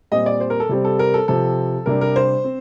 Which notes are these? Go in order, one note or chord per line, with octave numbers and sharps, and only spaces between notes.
A#2 G3 C4 D#5
D5
C5
A#4
A4
C3 G3 C4
A4
A#4
A4
C3 F3 C4 A4
C3 G3 D4 A#4
A#4
C5
C4